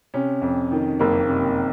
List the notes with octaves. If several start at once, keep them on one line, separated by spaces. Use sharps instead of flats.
C3 C#4
F2
D#3
F#1 A#3
C3